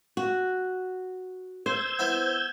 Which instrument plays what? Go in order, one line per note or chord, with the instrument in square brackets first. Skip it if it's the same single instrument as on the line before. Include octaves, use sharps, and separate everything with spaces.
[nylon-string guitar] F#4
[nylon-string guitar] C5 [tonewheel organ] E6 G6 G#6
[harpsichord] B3 C4 E4